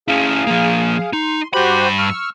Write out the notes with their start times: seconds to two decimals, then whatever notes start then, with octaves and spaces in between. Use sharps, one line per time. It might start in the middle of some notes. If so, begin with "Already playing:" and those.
0.08 C#4 E4 G#4 F5
0.47 F3 A#3
1.13 D#4 C6
1.54 G2 F#4 G4 C5 B5
1.98 C#6 E6 F6